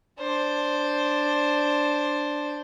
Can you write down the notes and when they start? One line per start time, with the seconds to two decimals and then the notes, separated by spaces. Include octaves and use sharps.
0.20 D4 C5